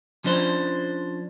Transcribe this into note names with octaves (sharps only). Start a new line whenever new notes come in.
F3 C#4 D4 C5